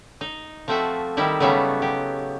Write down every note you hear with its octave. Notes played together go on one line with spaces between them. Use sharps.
D#4
F3 A3 C4 F#4 E5
D#3 G3 D#4 E4
C#3 F#3 G3 A3 B3
F#3 G4